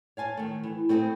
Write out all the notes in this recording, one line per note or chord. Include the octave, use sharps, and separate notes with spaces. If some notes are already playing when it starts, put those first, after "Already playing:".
C#5 F5 G#5 A5
D#3 A3
E3
A3 C4 E4 G#4 A4